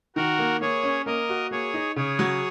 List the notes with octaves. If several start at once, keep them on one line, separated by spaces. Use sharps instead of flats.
D#3 F#4 A#4
A#3
A#3 G#4 C#5
C#4
A#3 A#4 D#5
F#4
A#3 G#4 C#5
D#4
C#3 G#4 C#5
F#3